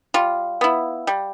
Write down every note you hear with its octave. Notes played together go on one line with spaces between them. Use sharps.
G3 F4
B3 E4
G3